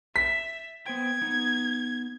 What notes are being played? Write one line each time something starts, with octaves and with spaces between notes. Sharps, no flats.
E5 B6
B3 C5 G5 G#6
B3 D#4